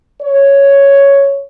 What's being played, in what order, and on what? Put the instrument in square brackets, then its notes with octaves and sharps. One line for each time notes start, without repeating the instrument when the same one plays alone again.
[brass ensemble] C#5